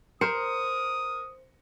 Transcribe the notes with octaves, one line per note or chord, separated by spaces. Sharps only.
A#4 C5 D#6 C#7